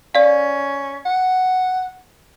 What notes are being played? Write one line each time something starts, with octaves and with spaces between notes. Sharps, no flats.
C#4 D5 F5
F#5